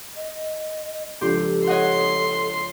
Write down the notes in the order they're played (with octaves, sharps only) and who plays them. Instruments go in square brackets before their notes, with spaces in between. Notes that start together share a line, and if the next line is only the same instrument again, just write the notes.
[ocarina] D#5
[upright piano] C#2 F3 D4 [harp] G4 C6 [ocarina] A4
[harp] C#5 D#5 F#5 [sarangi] C6